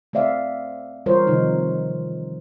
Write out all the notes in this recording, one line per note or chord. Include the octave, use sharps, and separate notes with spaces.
A3 C4 D5 E5 F5
E3 G3 F4 A#4 C5 C#5
C3 D#3 F3 D#4